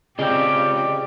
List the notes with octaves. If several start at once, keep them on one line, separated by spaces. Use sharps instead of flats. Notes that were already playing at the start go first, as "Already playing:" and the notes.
C#3 C4 F4 G4 G#4 D5 D#5